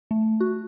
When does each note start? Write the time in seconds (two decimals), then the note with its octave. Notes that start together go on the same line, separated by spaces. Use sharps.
0.11 A3
0.40 F#4